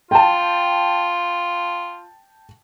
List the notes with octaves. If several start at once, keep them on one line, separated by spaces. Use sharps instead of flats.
F4 G5 A5